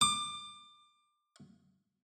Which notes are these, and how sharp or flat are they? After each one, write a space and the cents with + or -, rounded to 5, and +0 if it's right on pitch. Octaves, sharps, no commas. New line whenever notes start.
D6 +25